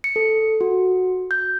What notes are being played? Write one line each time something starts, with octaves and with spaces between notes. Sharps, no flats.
C#7
A4
F#4
G6